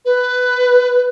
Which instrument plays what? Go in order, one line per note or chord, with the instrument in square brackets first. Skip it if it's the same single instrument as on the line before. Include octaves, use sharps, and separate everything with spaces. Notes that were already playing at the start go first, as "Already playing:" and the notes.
[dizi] B4